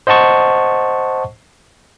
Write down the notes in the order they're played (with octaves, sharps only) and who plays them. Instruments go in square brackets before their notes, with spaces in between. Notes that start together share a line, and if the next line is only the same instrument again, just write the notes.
[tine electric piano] C5 D#5 F#5 A5 C#6